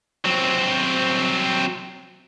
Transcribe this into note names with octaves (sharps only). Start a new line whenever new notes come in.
F#3 C4